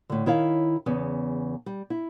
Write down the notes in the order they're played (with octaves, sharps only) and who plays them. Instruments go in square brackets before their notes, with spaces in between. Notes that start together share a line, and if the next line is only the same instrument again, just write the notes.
[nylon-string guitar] A2 D3
D#3 E4 C#5 F5
E2 C#3 B3
G3
E4